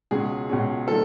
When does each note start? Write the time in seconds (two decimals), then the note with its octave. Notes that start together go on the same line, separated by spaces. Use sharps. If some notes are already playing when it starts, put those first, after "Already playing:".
0.11 C#2 B2 G#3 C#4 G#4
0.49 C#2 B2 G#3 C#4
0.87 D#3 G3 A#3 A4